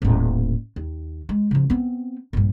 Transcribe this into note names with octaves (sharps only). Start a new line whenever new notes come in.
D#1 A2
D#2
G#3
C#3 F3
B3 C4
A#1 G2